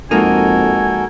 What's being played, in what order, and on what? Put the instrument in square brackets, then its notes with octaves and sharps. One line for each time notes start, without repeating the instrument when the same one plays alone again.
[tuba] F2 [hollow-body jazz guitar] G#3 A#3 D#4 [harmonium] F#4 A4 A#4 [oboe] G#5